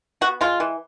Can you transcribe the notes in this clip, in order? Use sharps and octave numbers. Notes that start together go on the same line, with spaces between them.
B3 F#4
G#3 F4
E3